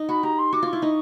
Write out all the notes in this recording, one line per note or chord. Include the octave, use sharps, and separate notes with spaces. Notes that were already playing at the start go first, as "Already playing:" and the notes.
Already playing: D#4
F#4 B5
G4 A#5
C6
F#4 D6
F4 C#6
E4
D#4